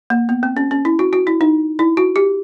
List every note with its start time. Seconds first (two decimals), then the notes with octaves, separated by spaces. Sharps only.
0.10 A#3
0.29 B3
0.43 C4
0.57 C#4
0.71 C#4
0.85 E4
0.99 F#4
1.13 F#4
1.27 E4
1.41 D#4
1.79 E4
1.97 F#4
2.16 G4